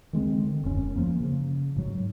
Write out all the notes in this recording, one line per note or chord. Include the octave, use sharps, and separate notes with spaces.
D#3 G#3 C4
D3
E1 F#2 C#4
F3 A#3
C#3
G#2 F#3